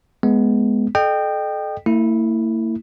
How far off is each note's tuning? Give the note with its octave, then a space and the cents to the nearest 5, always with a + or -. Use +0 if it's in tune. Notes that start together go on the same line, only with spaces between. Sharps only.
G#3 +15 B3 +0
A4 -30 D#5 -35 G5 +0
A#3 -45 E4 -10